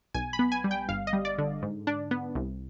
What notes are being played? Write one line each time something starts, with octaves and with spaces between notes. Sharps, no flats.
B1 G#5
B5
B3
G#5
G3
G5
G1 F5
D#5
G3
D5
D3
G#2
D4
B3
C2